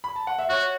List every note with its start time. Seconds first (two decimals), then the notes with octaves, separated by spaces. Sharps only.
0.04 B5
0.16 A5
0.27 F#5
0.39 E5
0.49 F#4 C#5